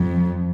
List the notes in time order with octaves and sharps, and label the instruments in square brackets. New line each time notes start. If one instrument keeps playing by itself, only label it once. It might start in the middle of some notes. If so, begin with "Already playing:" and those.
Already playing: [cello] F2